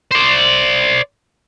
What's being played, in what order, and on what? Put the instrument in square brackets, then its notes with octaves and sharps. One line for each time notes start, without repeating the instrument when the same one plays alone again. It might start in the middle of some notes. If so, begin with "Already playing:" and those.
[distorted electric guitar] C5 D5